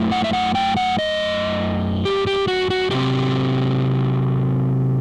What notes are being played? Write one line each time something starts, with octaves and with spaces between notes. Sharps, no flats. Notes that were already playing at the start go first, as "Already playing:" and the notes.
Already playing: F#2 A3 E4
F#5
E5
F#5
G5
F#5
D#5
G4
G4
F#4
F#4
C3 F#3 C4 G4